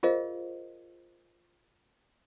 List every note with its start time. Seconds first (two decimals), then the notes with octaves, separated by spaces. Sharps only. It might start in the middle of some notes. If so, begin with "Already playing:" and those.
0.03 F4 G#4 A#4 C5 D#5 F5